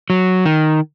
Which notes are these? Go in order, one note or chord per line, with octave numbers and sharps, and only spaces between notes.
F#3
D#3